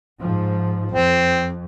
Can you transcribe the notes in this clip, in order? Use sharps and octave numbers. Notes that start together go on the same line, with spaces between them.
G#2 F3
F2 C4